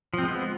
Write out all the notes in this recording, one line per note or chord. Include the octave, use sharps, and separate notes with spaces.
F3 G#3 B3 C4